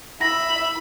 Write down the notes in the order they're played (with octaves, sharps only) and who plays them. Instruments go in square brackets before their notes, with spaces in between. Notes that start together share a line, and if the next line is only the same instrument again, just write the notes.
[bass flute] E4 [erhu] E5 [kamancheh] B5 [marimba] A#6